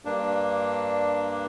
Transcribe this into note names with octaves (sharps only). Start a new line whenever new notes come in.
G2 A#3 D4